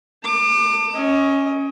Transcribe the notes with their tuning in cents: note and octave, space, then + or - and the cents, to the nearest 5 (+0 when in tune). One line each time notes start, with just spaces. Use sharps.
A5 +35 D6 +30
C#4 +0 D#5 +30